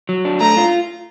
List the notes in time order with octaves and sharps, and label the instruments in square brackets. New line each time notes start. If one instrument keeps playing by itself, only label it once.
[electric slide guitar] F#3
D4
[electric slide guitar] A3 [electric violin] A#5
[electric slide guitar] F4